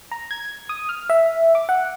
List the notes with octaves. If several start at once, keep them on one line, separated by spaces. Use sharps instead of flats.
A#5
G#6
D#6
F6
E5
D6
F#5